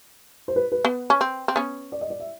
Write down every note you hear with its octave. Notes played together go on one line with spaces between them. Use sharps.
C5
B4
B4
B3
C#4
C4
C4
B3 C#4
D5
D#5
D5
E5